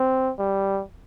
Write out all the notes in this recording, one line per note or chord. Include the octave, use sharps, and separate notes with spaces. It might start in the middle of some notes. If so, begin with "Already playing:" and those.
Already playing: C4
G3